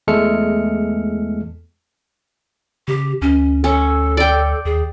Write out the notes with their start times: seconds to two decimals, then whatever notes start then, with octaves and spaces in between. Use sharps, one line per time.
0.08 E2 G#3 A3 A4 F6 C#7
2.88 C#3 G4
3.22 D2 C#4
3.64 C#4 A4
4.17 D5 G5
4.65 D#2 G#4